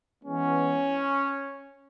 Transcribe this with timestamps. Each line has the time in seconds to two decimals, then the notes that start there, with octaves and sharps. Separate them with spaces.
0.24 E3 G#3 B3 C#4